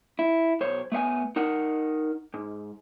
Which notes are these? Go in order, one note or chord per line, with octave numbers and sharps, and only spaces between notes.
E4
B1 C5 C#5
A3 B3 E5 G#5
D#4 A#4 F#5
G#2